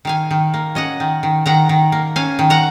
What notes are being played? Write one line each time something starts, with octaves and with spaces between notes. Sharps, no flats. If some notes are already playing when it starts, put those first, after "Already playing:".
D#3 F5 G#5
D#3
A#3
C#4 D#5 F#5
D#3
D#3
D#3 F#5 A#5
D#3
A#3
C#4 F5 G#5
D#3
F#5 A#5